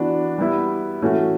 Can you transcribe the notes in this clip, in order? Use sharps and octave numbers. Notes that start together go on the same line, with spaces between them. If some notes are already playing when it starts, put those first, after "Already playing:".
Already playing: E3 B3 D4 F#4
G3 B3 E4
A2 E3 A3 C#4 F#4